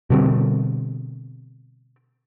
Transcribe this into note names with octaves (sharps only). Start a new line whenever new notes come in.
B2 D3 G3 C4